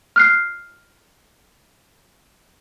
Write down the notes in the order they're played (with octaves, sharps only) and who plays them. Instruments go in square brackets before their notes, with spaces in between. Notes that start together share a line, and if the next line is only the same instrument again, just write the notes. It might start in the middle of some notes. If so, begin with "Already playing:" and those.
[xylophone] F6 F#6 C7